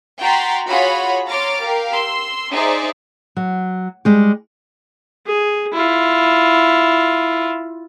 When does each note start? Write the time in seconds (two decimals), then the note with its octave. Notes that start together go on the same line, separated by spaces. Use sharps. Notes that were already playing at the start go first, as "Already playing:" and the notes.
0.20 F#4 G5 A#5 C6 A6 B6
0.69 F4 F#4 G#4 C#5 F#5 B5
1.29 C#5 A#5 C6 D6 F6 A6
1.61 G4 A#4 F5
1.93 C6 E6
2.52 D#4 G#4 C5 D5 E5
3.36 F#3
4.05 G3 G#3 G4
5.27 G#4
5.73 E4 F4